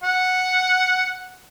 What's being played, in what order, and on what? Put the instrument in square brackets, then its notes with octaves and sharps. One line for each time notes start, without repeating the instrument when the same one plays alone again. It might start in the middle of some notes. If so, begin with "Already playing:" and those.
[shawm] F#5